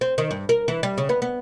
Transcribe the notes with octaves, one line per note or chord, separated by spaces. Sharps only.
C4
D#3
G2
A#4
E3
G3
C#3
B3
B3